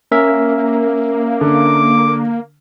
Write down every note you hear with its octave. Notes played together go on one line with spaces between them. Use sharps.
A#3 C#4 A#4 E5
D3 D6